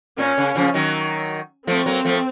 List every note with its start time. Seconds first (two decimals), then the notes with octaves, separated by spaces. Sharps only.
0.18 A#2 C#4
0.38 C#3
0.55 C#3 F3
0.74 D#3 F#3
1.67 F3 A3 C4
1.86 F#3 A#3
2.05 F3 A3